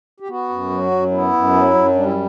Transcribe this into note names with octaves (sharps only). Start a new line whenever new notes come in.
G4
B3 F#4
F#2
F#3
F#2
B3 E4
F#2
F#3
F#2
G3 D4
E4